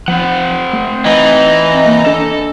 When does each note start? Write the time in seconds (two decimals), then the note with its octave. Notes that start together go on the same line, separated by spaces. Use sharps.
0.08 F3 C4 C5 F#5
0.73 A3
1.05 E3 D#4
1.86 A#3
2.06 D4 A4